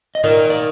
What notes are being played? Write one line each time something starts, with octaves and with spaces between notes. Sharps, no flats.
D#5
D#3 A#4 D5
D5